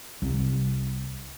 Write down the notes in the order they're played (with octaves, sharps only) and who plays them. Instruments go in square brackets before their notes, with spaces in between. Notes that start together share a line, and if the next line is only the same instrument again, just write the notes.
[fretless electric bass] C2 G3